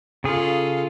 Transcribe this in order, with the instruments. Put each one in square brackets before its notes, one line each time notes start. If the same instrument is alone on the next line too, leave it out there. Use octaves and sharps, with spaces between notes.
[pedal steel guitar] C#3 G#4 [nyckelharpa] F4 A4